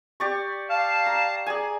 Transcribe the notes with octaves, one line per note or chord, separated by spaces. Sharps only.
G4 D5 C#6
F5 A5
A#5
G#4 D5 G#5